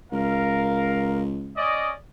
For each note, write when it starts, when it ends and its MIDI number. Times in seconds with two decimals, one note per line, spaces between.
0.12 1.65 37
0.12 1.22 70
0.12 1.22 77
1.57 1.92 61
1.57 1.92 74
1.57 1.92 75